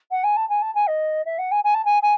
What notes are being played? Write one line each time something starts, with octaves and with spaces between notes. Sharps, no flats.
F#5
G#5
A5
G#5
A5
G#5
D#5
E5
F#5
G#5
G#5
A5
G#5
G#5